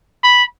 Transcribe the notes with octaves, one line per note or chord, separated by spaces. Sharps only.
B5